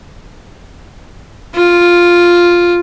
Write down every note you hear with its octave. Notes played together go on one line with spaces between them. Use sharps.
F4